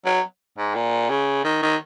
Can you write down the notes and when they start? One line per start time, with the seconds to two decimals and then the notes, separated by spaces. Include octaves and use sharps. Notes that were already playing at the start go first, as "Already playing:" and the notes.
0.05 F#3
0.58 G#2
0.75 A#2
1.10 C#3
1.45 D#3
1.62 D#3